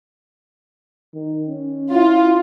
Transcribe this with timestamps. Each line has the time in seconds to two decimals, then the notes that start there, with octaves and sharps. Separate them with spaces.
1.14 D#3
1.48 C#4
1.93 E4 F4